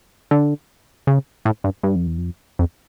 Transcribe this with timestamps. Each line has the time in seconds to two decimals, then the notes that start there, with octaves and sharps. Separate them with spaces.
0.31 D3
1.07 C#3
1.45 A2
1.64 G2
1.83 G2
1.96 F2
2.07 E2
2.18 F2
2.59 F2